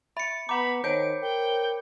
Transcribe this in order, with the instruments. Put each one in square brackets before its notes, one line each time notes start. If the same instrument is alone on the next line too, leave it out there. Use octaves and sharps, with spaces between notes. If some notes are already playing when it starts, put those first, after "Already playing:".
[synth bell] E5 [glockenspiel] B5 C#7 [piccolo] A6
[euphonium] B3 [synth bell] F#5 A#5 [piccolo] B5 [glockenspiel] D6
[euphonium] D#3 [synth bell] C5 C#5 [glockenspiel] G6 [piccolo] D7
[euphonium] A#4 [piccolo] G5